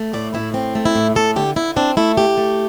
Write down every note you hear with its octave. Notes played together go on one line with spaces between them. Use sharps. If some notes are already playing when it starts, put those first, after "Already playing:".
Already playing: A3
A2 D5
A2 E4
C4
A3
E4
A2
A3 A4
D3 G4
D3 E4
C4 D4
A3 E4
D3 G4
A3